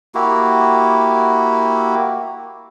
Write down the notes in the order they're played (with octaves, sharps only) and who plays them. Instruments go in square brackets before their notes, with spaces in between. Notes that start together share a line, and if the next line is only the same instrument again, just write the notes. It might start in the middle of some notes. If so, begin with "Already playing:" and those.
[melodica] A#3 E4 F#4 G4